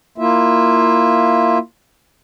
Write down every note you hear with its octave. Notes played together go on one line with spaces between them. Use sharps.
A#3 E4 F4 E5